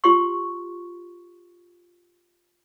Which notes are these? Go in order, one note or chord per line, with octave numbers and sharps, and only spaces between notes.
F4 G4 C6 C#6